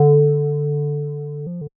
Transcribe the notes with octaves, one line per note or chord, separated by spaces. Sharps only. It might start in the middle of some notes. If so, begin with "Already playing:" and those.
Already playing: D3
F3
D3